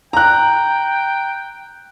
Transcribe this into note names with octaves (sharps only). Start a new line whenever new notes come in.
G5 A#5 F#6